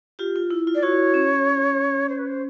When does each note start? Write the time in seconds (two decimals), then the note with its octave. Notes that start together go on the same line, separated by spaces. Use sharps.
0.19 F4 G4
0.36 F4
0.51 E4
0.67 F4
0.75 D5
0.83 E4 F#4 C#5
1.14 C#4
2.09 C5
2.19 B4
2.27 C5